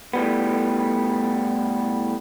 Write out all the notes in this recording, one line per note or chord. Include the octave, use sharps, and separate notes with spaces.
A2 G3 B3